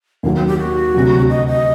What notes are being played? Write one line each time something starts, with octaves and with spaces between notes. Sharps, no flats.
D#2 D#3 F#3 A#3
C4
G4
F#4
D2 C3 F#3
D#5
D#5